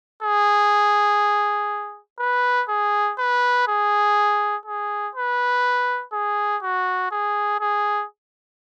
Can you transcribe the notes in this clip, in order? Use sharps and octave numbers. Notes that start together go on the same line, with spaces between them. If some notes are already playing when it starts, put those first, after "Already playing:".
G#4
B4
G#4
B4
G#4
G#4
B4
G#4
F#4
G#4
G#4